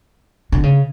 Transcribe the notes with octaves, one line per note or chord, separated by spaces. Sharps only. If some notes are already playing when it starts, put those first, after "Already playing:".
D3
C#3